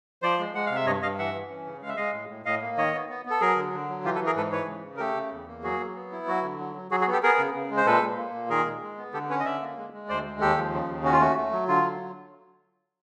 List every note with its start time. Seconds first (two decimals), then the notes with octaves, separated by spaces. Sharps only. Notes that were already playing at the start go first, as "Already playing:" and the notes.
0.22 F3 C5 D5
0.39 G#3
0.55 G#3 F#5
0.66 C3 F5
0.76 E5
0.86 G2 C#5 D#5
1.02 G2 D#5 F5
1.19 E3 E5 F#5
1.34 E3
1.50 C#4
1.67 C#3
1.82 G#3 F5
1.89 E5
1.96 G#3 D#5 F5
2.13 A2
2.30 A2
2.45 A2 D#5 F5
2.62 A#3
2.77 D#3 C#5 D#5
2.93 B3
3.09 B3
3.25 B3
3.30 A4
3.40 F#3 G#4 A#4
3.56 D3
3.73 D3
3.89 F#3
4.05 E3 F4 G4
4.15 A4 B4
4.21 E3
4.26 G#4 A#4
4.36 G#2 A4 B4
4.52 E3 B4 C#5
4.68 C#3
4.84 C#3
4.97 A#4
5.00 A3 G4 A4
5.15 C#3
5.32 E2
5.47 A#3
5.63 F#3 F#4 G#4
5.80 F#3
5.95 B3
6.12 E4
6.27 F#3 F#4
6.43 D3
6.59 F#3
6.75 F#3
6.91 F#3 F#4 G#4
7.01 F#4 G#4
7.07 B3
7.12 G4 A4
7.23 B3 G#4 A#4
7.38 C#3
7.54 C#3
7.70 G#3
7.77 C5
7.86 A#2 A4 B4
8.03 A#2
8.18 A#3
8.34 A#2
8.50 D#3 G#4 A#4
8.66 G#3
8.82 G#3
8.97 B3
9.13 D3 G4 A4
9.30 C#4 B4 C#5
9.40 D#5
9.45 D3 D5 E5
9.61 A#3
9.77 G#3
9.93 G#3
10.09 D2 C5 D5
10.24 G#3
10.40 D#2 G4 A4
10.57 F3
10.73 C#3
10.89 D#2
11.04 C#4 F#4
11.13 F4
11.20 A3 F#4
11.37 A3
11.52 F#3
11.68 D3 F4
11.84 F#3